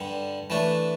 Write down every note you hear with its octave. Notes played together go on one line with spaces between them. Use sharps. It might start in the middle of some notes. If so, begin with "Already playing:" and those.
Already playing: G2 D3 G3
E3 A3 D4